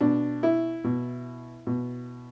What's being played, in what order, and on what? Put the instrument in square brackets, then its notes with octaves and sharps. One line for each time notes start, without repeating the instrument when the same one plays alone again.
[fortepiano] B2 D4
E4
B2
B2